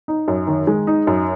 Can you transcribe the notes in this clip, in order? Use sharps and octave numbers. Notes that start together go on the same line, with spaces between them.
D#4
F#2
D#3
G#3
D#4
F#2